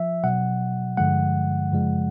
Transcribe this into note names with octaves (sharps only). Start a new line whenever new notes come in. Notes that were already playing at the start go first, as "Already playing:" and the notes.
Already playing: F3 E5
B2 F#3 F#5
G2 D3 F3 G#3 F#5
F#2 C#3 F3 G#3